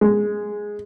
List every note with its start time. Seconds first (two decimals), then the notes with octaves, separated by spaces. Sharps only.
0.01 G#3